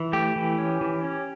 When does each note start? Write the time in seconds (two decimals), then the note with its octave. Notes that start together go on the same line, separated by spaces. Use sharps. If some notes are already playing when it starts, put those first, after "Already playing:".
Already playing: E3
0.13 A3 G4
0.36 E3
0.58 C#4
0.81 E3
1.04 C#4